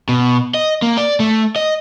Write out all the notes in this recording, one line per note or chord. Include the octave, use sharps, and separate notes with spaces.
B2
D#5
A#3
D5
A3
D#5